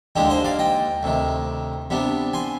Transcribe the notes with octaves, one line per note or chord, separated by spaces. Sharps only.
D#2 D3 G#3 D4 D#4 G4
C5 D#5
D5 F5
D#5 G5
D2 C3 D#3
C3 G3 B3 D4
G#5 C6